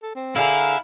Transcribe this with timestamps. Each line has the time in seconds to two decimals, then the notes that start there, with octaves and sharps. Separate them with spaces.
0.03 A4
0.16 C4
0.36 D3 E4 G#4 A#4 F5